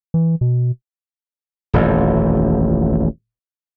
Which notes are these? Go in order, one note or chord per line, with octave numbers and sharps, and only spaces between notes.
E3
B2
D#1 A1 F2